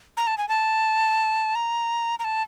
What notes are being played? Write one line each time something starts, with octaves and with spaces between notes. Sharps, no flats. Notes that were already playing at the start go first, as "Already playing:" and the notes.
A#5
A5
G#5
A5
A#5
A#5
A5